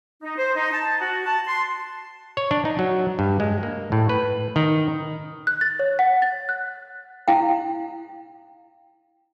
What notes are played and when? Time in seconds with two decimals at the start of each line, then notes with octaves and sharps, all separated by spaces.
0.22 D#4
0.38 C5
0.55 D#4
0.73 A5
1.00 F#4
1.26 A5
1.47 C6
2.37 C#5
2.51 D4
2.65 D#4
2.79 F#3
3.19 G2
3.40 G#3
3.63 A#3
3.92 A2
4.09 B4
4.56 D#3
5.47 F#6
5.61 A6
5.79 C#5
5.99 F#5
6.22 A6
6.49 F#6
7.28 E4 F5 G5